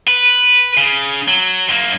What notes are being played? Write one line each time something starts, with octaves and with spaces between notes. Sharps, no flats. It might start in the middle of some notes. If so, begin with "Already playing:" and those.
B4
C#3
F#3
F#2 A#3